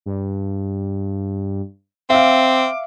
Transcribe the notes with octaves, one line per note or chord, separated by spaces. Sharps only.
G2
C4 E5 F5 D6